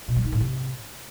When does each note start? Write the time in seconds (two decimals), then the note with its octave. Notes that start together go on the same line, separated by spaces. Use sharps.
0.08 B2
0.16 G3
0.24 D#4
0.32 A2
0.40 C3